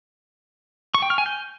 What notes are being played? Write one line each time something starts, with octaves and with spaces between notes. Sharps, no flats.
C#6
G5
F6
G#5
G6